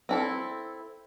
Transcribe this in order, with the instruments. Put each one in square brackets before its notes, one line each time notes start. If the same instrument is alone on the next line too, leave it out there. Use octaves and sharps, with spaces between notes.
[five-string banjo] C4 E4 A4